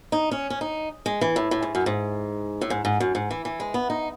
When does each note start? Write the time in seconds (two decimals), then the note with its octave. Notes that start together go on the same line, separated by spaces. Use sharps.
0.12 D#4
0.31 C#4
0.50 C#4
0.61 D#4
1.06 G#3
1.21 E3
1.36 A2
1.51 A2
1.63 G#2
1.75 F#2
1.86 G#2
2.61 A2
2.70 G#2
2.85 G#2
3.00 F#2
3.15 G#2
3.31 E3
3.45 E3
3.60 G#3
3.74 B3
3.90 D#4